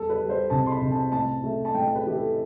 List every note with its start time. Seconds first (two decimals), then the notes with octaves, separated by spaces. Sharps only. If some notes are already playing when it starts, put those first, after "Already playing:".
Already playing: E2 G3 A4
0.10 B4
0.19 G3
0.29 C5
0.50 C2 A5
0.66 C6
0.71 B5
0.81 C2
0.92 A5
1.12 A1 A5
1.43 A3
1.65 A5
1.74 A1 G5
1.95 B4
2.06 E3 G4
2.16 A4